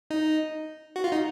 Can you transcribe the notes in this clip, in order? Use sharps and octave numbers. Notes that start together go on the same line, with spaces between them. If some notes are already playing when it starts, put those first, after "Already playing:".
D#4
F#4
F4
D#4